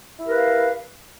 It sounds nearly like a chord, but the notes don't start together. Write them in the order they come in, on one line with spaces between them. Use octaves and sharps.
E4 G4 A#4 B4 F5